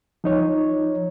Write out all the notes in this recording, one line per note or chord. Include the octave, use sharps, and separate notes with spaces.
F3 D#4 C#5